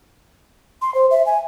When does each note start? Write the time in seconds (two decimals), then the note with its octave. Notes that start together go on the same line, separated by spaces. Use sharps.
0.82 C6
0.95 C5
1.11 E5
1.26 G#5